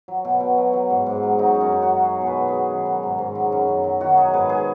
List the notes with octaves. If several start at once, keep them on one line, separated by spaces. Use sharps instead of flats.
F#3
B2
B2
F#3
F#3
G#2
G#2
F#3
F#3 D#4
F#2
C#4
F#2
F#4
F#3
F#3 G#4
B2
B4
B2
G#4
F#3
D#3
F#3
G#2
G#2
F#3
F#2
F#2
F#3
D#3 F#4
F#3 G#4
G#2 B4
G#4